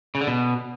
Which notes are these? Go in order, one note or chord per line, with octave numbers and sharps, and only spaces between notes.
C#3
D3
B2